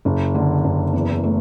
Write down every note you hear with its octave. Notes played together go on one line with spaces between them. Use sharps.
F#1
D3
F#1
E2
A3